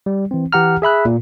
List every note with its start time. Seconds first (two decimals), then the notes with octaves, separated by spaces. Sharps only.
0.06 G3
0.31 E3 C4
0.52 E3 G4 F#5 A#5 F6
0.82 G#4 E5 B5 F#6
1.05 A#2